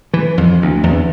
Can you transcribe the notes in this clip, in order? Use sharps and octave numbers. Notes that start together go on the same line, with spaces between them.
E3
F2
D2
E2